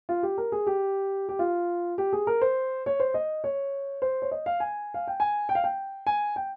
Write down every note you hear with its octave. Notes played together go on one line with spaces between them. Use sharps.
F4
G4
A#4
G#4
G4
G4
F4
G4
G#4
A#4
C5
C#5
C5
D#5
C#5
C5
C#5
D#5
F5
G#5
F5
G5
G#5
G5
F5
G5
G#5
G5